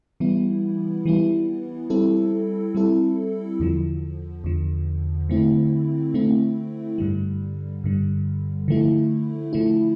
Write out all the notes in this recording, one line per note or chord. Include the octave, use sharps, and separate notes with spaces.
E3 G3 B3 E4
E3 G3 B3 E4
G3 C4 E4 A4
G3 C4 E4 A4
E2 D3 F3
E2 D3 F3
D3 A3 C4 E4
D3 A3 C4 E4
G2 D3 G3
G2 D3 G3
D3 F3 A3 E4
D3 F3 A3 E4